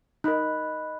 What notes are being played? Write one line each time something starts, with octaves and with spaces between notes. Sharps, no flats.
D#4 A#4 D#5 B5 F#6